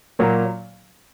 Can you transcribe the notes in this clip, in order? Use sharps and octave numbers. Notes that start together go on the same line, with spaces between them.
A#2 F#3 A#3